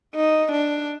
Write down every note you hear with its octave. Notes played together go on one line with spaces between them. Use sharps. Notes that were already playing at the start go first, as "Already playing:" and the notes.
D#4
D4